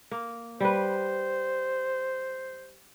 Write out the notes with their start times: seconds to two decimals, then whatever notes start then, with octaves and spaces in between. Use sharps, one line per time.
0.11 A#3
0.60 G3 B4 C5